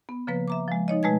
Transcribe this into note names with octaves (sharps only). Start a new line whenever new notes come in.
B3
C#3 F3 A#3 B4
E5 A#5 D6
F3 G#3
F3 D#4 C#5 D#5
B2 G#3 A3 B4 G#5 G#6